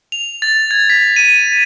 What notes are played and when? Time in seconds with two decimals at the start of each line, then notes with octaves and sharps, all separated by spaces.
0.12 F7
0.42 A6
0.71 G#6
0.90 B6
1.16 D#7